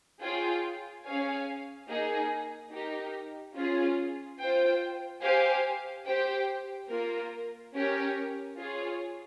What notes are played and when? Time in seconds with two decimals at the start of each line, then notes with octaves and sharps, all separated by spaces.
0.21 F4 G#4 C#5 G5
1.04 C#4 G#4 C#5 F5 G#5
1.88 A#3 D#4 G#4
2.72 D#4 G4 A#4
3.55 C#4 F4 G#4
4.39 F4 C5 G5
5.23 G4 C5 F5 G#5
6.06 G4 C5 G5
6.89 A#3 F4 A#4
7.73 C#4 G4 A#4 C#5
8.57 F4 G#4 C#5